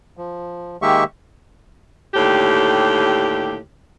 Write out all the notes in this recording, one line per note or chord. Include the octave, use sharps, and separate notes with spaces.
F3
D#3 G#3 A#3 G4 E5 C#6
D#2 A2 D3 G4